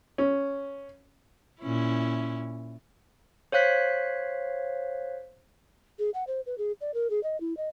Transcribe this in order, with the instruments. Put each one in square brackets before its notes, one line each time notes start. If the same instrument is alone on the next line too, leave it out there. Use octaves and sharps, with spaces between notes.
[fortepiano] C#4
[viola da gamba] A#2 C#4 E4
[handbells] C5 C#5 F5 F#6 B6
[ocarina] G#4
F#5
C5
B4
G#4
D5
A#4
G#4
D#5
E4
D#5